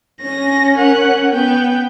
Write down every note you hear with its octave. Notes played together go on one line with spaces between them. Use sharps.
C#4 A#6
A#4 F#5
B3 G5